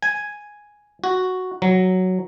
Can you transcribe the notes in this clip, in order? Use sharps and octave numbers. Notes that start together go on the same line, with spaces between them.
G#5
F#4
F#3